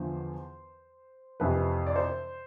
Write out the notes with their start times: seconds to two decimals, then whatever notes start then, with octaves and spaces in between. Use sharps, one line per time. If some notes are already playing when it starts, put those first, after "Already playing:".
Already playing: E2 D3 F3 C5
1.40 F2 C3 E3 B4
1.87 D5
1.96 C5